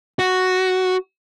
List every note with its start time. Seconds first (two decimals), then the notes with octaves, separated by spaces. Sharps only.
0.19 F#4